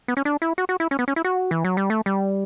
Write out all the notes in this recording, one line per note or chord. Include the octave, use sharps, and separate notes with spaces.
B3
C#4
D4
E4
F#4
F#4
E4
C#4
B3
C#4
E4
F#4
E3
F#3
G3
A3
G3